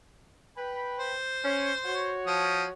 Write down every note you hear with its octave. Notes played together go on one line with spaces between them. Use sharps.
B4 G5 B5
C5
C#4
F#4 C#5
F3 D#6